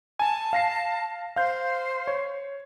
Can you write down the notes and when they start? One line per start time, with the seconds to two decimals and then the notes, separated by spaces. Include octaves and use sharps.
0.19 G#5 A5
0.53 F5 A#6 C7
1.36 C5 F5 G6
2.08 C#5